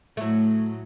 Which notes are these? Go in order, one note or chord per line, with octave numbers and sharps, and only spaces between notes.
A2 F#3 A3